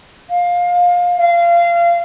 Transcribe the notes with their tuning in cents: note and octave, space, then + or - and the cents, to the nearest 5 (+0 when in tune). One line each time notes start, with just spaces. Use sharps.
F5 +20
F5 -25